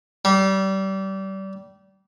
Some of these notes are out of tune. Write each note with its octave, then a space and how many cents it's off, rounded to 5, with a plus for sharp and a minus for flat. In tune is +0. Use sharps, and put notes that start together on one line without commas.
G3 -25